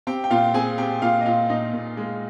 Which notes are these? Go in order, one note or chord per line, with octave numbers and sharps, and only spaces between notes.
C4 G4 G5
G5
A#2 F4 F5
C4 G#4 G#5
C4 G4 G5
A#2 F4 F5
D#5
A#2 F4 F5
A#2 D#4 D#5
A#2
G#3